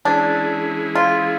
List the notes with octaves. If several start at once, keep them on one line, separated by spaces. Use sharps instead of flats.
E3 G#3 C#4 D4 E4 G#4
F4